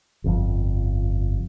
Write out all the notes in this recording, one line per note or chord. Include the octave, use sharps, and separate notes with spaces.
G1 F2 C3 F3